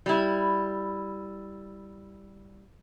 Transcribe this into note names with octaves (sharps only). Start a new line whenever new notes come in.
G3 E4